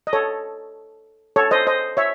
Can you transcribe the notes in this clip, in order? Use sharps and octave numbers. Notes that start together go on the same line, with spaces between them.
D#5
A4 C#5
A4 C#5
C5 D#5
C5 D#5
C#5 E5